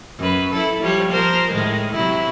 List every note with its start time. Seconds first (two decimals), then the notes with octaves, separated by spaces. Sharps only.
0.18 F#2 B4
0.52 E4 A4
0.82 F3 G3 C#5
1.11 F3 A#4 C5
1.51 A2 D#3 G#3
1.94 C3 F#3 E4